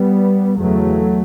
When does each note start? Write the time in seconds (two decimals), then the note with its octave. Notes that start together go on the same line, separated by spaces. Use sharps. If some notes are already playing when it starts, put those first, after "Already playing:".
Already playing: G3 B3
0.59 E2 C#3 F#3 A3